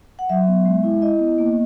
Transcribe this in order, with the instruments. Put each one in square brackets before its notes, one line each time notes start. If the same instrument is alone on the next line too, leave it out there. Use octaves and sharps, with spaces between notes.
[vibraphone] F#5
F#3 E5
B3
G#3
E4
E4 D#5
B3
A#3